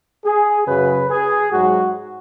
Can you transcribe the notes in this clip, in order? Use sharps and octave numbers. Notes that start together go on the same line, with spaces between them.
G#4
F#2 C#3 F#3 B4
G#4
G#2 F#3 F#4